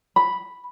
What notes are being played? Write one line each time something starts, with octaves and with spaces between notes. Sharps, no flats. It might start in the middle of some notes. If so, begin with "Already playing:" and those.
B5